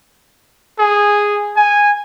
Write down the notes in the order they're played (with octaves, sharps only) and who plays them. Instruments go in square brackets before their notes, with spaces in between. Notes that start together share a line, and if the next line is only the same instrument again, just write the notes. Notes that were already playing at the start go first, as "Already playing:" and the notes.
[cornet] G#4
G#5